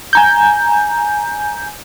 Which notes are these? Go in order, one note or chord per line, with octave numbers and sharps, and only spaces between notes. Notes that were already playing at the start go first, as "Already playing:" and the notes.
G#5 A#5 G6